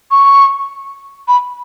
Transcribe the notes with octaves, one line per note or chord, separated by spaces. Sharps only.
C#6
B5